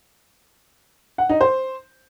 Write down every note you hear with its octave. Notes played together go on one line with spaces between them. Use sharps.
F#5
D#4
C5